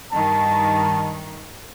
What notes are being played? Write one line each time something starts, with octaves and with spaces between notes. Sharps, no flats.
G2 D#3 A5